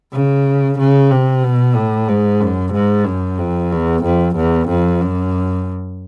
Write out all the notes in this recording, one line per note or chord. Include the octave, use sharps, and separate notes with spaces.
C#3
C#3
C3
B2
A2
G#2
F#2
G#2
F#2
F2
E2
F2
E2
F2
F#2